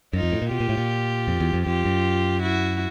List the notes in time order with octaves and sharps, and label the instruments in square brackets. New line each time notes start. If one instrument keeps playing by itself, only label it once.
[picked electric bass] F#2 [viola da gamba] D#4 F4
[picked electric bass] F2
A2
A#2
[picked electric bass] B2 [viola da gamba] F4 G4
[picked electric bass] A#2
A2
A#2
F2
E2
F2
[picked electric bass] F2 [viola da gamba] F4 G4
[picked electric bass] F#2
[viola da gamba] E4 F#4